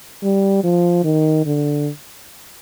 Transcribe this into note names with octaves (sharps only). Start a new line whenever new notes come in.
G3
F3
D#3
D3